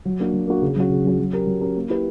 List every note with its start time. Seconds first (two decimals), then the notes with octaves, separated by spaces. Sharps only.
0.05 F#3
0.20 A#3 D4 F#4
0.33 F#3
0.47 A#3 D4 F#4
0.62 C#3
0.76 F#3 C#4 F#4
0.90 C#3
1.05 F#3 C#4 F#4
1.18 F#3
1.33 C#4 G4 A#4
1.47 F#3
1.61 C#4 G4 A#4
1.76 A#3
1.90 E4 G4 B4